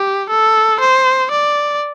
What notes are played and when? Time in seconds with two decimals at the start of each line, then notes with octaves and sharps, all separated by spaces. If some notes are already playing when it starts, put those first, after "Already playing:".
Already playing: G4
0.30 A4
0.81 C5
1.32 D5